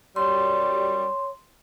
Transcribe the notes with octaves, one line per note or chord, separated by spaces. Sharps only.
F#2 G3 C#5 C6